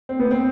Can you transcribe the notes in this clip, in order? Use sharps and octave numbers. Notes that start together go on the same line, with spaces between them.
C4
B3
C4